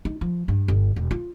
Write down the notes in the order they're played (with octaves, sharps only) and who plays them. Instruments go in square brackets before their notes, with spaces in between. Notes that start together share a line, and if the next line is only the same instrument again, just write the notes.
[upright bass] D#4
F3
G2
G1
E1
F4